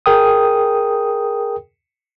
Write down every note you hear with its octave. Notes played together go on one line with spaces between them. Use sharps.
G#4 A#4 G5 D#6